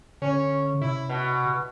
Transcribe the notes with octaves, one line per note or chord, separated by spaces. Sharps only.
D3 C#4
C3 E4
B2